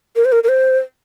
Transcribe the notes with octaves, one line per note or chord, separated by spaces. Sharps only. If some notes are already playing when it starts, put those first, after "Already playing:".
A#4
C5
A#4
A#4
C5